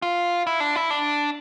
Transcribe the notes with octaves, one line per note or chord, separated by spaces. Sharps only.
F4
E4
D4
E4
D4